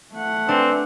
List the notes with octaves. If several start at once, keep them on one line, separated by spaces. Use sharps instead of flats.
A3 F#5
C4 D4 B4 D5 G#5